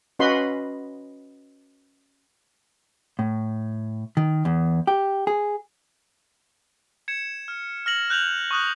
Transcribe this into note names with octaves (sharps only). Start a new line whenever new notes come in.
C#4 F#4 B4 D#5 B5 C6
A2
D#3
E2
G4
G#4
G#6 C#7 E7
F6
F6 A#6 F#7
F#6 G6 F7 F#7
C#6 D#6 F#6